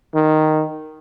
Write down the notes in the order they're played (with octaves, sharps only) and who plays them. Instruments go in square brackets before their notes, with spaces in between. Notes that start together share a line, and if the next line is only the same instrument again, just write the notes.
[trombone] D#3